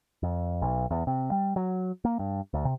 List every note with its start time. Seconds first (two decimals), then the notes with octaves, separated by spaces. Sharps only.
0.23 F2
0.62 B1
0.91 E2
1.07 C3
1.32 G3
1.56 F#3
2.05 A#3
2.19 G2
2.54 D2
2.65 C3